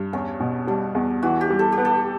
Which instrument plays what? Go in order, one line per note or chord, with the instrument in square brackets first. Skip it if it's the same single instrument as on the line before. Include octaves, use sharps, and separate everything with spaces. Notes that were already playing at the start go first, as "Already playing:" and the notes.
Already playing: [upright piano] G2
[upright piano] E2 [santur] C#4
[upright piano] B2
[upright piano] G3 [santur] D4
[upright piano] E2
[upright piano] E3 [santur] F#4
[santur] G4
[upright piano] G3
[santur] A4
G4
[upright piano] B3
[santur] A4